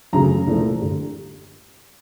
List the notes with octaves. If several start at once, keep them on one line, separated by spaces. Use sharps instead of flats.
F#2 C#3 F#3 A3 A#5
C2 A#2 F3 A3
G2 D3 G3